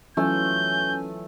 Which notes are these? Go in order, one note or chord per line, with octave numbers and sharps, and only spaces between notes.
E3 F#3 A3 C#4 F4 G#5 G6